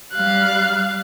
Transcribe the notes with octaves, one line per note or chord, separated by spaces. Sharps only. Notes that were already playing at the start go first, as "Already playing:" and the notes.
G3 F5 F#6